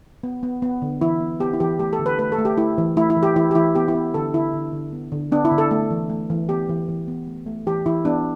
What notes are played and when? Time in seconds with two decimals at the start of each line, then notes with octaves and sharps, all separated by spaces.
0.23 B3
0.43 B3
0.62 B3
0.82 D3
1.01 E3 E4
1.20 B3
1.40 B3 G4
1.53 E4
1.60 E3 G4
1.79 A3 G4
1.93 A4
1.99 D3
2.06 B4
2.19 A3 B4
2.32 A4
2.38 A3
2.45 G4
2.58 A3 E4
2.78 E3
2.97 A3 E4
3.10 E4
3.17 E3
3.23 G4
3.36 E3 E4
3.51 G4
3.55 E3 E4
3.75 B3 G4
3.88 E4
3.95 B3
4.14 D3 A4
4.34 D3 E4
4.53 D3
4.73 D3
4.92 B3
5.12 D3
5.32 B3 D4
5.45 E4
5.51 D3
5.58 A4
5.71 A3
5.91 E3
6.09 A3
6.30 E3
6.49 B3 G4
6.69 E3
6.88 E3
7.08 B3
7.27 A3
7.47 A3
7.67 E3 G4
7.86 E3 E4
8.05 B3 D4